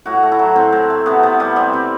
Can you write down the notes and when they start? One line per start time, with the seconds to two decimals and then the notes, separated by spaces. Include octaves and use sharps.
0.06 A2 F#4
0.23 A3
0.32 E4
0.39 F#3
0.56 A2 C4
0.72 A2
0.90 A3
1.06 C3 B3
1.23 C3 B3
1.40 G3 B3
1.56 G3 C4
1.73 C3